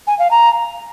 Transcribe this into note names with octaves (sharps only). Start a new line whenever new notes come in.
G#5
F5
A#5